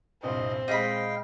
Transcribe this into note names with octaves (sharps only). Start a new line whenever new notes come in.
C2 G2 A#2 C4 D#5
A#2 G#3 D#5 F5 G5 B5